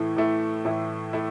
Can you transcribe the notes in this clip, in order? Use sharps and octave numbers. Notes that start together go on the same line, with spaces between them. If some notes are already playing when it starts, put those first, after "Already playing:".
Already playing: A2 E3 A3 E4
A2 E3 A3 E4
A2 E3 A3 E4
A3 E4